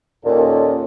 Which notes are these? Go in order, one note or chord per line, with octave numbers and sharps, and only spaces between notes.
D#2 A#2 C#4 A4 D#5